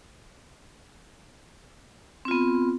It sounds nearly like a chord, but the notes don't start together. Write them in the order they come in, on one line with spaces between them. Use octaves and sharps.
C4 F4 B3